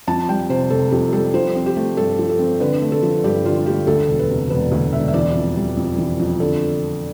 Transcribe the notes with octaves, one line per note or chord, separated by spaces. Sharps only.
F2 A5
G3 G5
C3 C5
F1 A4
F2 G4
G3 A4
F3 C5
C4
G4
A3
G2 A4
F3
A4
C4
D3 B4
A3
A4
F3
G2 G4
D3 F4
A3 G4
D2 A4
E1
B4
C3
E1 B4
D2
E1 E5
E5
E3 D5
F2
G3
F2
E3
F2
D3 A4